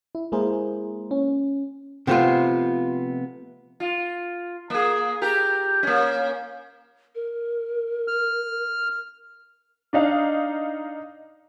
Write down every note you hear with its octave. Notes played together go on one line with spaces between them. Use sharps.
E4
G#3 A#3 E4 G#4 A#4 C5
C#4
C3 F3 A3 B3 F4
F4
A#3 G#4
G4 A#4
A#3 C#4
A#4
F6
D4 D#4 F5